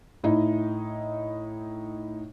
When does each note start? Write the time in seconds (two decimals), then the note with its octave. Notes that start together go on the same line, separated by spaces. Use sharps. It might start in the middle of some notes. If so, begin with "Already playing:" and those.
0.24 A2 D#4 E4 D#5